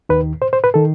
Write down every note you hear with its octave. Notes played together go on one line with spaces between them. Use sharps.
D#2 D#3 B4
C5
C5
B4
D#3 A4